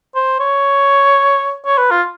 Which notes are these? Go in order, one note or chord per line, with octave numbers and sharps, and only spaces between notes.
C5
C#5
C#5
B4
F4